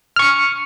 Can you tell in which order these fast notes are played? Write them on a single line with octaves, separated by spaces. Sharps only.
F6 C#6 C#7